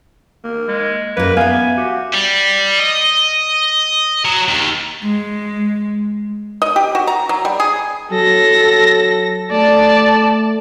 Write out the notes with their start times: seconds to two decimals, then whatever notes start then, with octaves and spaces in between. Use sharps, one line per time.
0.44 A#3
0.68 G#3
1.17 F#2 A#3 A#4 B4
1.37 B3 E5 F5 G#5
1.77 F#4 G4
2.13 G3
2.79 D#5
4.25 F#3
4.49 D#2
5.03 G#3
6.62 D#5
6.76 G4
6.95 F#4
7.07 A#5
7.29 F#3
7.45 G3
7.60 G#4
8.12 F#3 A4 A#6
9.52 A3 D5 A5